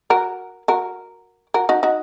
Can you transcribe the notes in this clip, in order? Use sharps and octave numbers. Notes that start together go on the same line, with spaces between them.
F#4 A#4
F#4 A#4
F#4 A#4
D#4 F#4
D#4 F#4